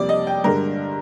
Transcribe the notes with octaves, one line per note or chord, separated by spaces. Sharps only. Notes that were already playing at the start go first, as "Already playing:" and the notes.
Already playing: F2 C3 G3 A#3 D5
D#5
G5
G2 D3 G#3 A#4